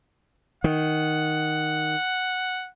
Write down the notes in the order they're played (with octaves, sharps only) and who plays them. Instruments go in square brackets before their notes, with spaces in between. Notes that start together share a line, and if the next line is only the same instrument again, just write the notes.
[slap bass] D#3 [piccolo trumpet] F#5